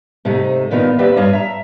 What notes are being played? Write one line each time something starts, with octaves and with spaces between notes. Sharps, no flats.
G#2 C3 A3 D#4
A#2 D#3 B3 D#4 F4
A#3 C4 G4 B4 D5 E5
G2 D#4 F4 C#5 D#5
E5 A#5